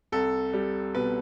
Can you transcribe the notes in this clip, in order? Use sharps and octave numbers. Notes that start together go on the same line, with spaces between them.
C2 A4
G3
B2 B4